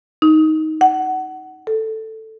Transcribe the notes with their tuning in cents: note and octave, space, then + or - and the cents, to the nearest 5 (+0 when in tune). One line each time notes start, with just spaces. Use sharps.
D#4 +10
F#5 +20
A4 +5